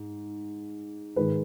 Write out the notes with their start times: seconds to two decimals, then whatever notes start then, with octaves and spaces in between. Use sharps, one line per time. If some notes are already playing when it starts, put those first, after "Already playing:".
Already playing: G#2
1.16 G#2 D#3 G#3 B4